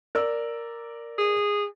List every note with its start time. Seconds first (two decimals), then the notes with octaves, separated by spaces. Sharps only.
0.15 A#4 D5 E6
1.18 G#4